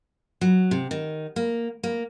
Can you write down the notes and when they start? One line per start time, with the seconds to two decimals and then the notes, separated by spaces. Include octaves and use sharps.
0.41 F#3
0.71 C3
0.91 D#3
1.36 A#3
1.83 A#3